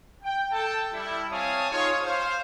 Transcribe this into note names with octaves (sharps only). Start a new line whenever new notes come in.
G5
A4 G5 A5
G3 E4
C4 C#5 F5 G#5 A5 D#6
D#4 F4 G#4 C#5
C5 F5